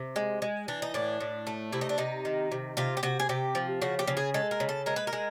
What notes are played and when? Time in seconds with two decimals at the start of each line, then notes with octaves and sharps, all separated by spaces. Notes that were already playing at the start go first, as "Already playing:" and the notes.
Already playing: C3
0.16 G#3
0.42 G#3
0.68 E3 D4
0.82 D#4
0.94 A2 D4
1.20 A2
1.47 A3
1.72 C3 E4
1.81 D#4
1.89 D4
1.98 C3 D#4
2.25 D#3
2.52 C3
2.77 C3 F4
2.97 G4
3.03 C3 F#4
3.20 G#4
3.29 C3 G4
3.55 F3
3.82 C#3 F#4
3.99 G4
4.08 C#3
4.17 G#4
4.34 G#3 A4
4.51 A#4
4.60 C#3
4.69 A4
4.86 G#3 A#4
4.96 B4
5.07 A#4
5.13 G#3